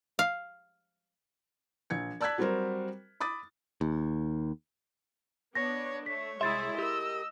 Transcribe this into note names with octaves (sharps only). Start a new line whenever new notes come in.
F5
A#1 G#6 C#7
D5 A5 E6 F#6 G#6 B6
F#3 G3 C4 F#4 A#4 C5
B5 D6 D#6 A6
D#2
B3 D4 C#5 A#6
A3 C#5 B6
C2 G#3 E4 G#4 E5 C6 A6
G4 A#4 D#5 E6